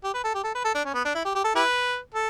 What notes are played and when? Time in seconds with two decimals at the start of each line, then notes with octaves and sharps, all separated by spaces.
0.04 G4
0.14 B4
0.24 A4
0.34 G4
0.44 A4
0.55 B4
0.64 A4
0.75 D4
0.85 C#4
0.94 B3
1.05 D4
1.15 E4
1.25 G4
1.35 G4
1.44 A4
1.55 E4 G4 B4
2.14 A4